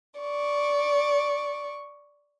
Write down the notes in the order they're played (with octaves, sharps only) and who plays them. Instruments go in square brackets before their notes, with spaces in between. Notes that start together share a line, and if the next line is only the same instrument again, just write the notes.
[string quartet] D5 C#6